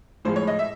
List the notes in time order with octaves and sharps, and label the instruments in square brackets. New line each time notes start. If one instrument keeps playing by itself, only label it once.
[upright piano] A2 F3 G#3 C5
C#5
D#5
E5